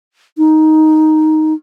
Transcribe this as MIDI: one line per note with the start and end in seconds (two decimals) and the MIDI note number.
0.38 1.53 63